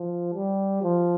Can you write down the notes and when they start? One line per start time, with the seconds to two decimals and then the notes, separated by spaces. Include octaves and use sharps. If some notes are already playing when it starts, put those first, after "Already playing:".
Already playing: F3
0.34 G3
0.83 F3